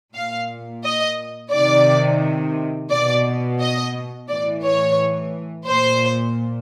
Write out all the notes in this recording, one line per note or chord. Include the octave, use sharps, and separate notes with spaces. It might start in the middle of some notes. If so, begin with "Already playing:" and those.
A#2 F5
D#5
C3 D#3 D5
B2 D5
D#5
A2 E3 D5
C#5
A#2 C5